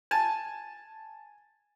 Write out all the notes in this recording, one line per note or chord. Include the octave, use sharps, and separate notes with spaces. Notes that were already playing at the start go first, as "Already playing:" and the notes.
G#5 A5